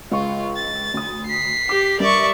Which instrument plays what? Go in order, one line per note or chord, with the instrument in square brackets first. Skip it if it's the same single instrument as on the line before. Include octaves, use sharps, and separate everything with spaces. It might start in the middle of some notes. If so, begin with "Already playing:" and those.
[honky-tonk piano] C#2 C#6 [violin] F4
[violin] A6
[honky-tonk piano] D2 D#6
[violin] B6 C7
[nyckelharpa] G4 [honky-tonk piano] D6
[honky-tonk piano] G2 [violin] A#4 E5 [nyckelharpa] D5 C#6